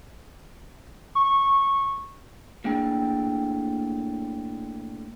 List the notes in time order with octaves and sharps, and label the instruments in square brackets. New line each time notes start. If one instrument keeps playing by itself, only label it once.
[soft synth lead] C#6
[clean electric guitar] A2 A#3 D4 G#4 G5